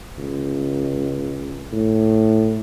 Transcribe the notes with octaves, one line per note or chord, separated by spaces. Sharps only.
C#2
A2